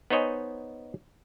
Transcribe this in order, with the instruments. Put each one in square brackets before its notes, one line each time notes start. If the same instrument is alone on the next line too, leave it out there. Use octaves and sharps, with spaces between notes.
[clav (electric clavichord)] B3 D#4 C5 C#5 D#5 G#5